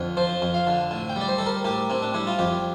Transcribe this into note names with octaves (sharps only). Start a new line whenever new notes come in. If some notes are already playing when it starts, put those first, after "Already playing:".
Already playing: F2 D3
F3 C5
F2
F5
D3
A2
G5
G3 D5
C5
G3 A4
A#4
A2 G4
A2 C4
D4
G3 E4
F4
F2 G4